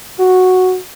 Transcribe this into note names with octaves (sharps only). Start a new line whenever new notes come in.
F#4